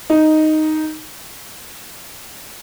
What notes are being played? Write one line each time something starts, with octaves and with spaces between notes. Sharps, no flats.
D#4